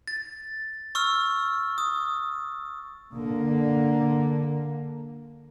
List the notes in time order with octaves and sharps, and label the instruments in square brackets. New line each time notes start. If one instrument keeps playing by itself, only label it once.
[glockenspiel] A6
C#6 E6 F6
D#6
[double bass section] D3 A#3